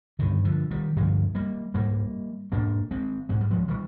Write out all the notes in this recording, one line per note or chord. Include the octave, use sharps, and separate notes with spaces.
G2 D3 D#3
D3 F3
D#3 G3
G2 D3 F3 G#3
G3 A#3
G#2 G3 A#3
G#2 A#3 D4
G#3 C4
G#2 G#3
G3
F3 G#3
D#3 G3